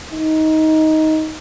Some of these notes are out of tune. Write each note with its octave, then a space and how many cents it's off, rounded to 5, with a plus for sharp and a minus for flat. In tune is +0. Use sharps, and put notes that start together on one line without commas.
D#4 +15